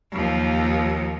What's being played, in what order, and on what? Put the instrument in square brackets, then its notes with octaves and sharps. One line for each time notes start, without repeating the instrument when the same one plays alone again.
[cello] D#2 F3